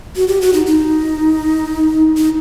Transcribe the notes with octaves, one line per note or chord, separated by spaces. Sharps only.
F#4
G4
F#4
D#4
D#4
D#4